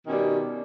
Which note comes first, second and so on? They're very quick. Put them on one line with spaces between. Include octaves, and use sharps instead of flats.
D#3 B2 C#4 G3